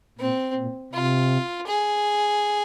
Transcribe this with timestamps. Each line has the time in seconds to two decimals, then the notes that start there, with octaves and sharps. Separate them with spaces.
0.19 A#2 C4
0.56 A#2
0.93 C3 F4
1.67 G#4